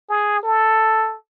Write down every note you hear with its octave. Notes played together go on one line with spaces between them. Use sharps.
G#4
A4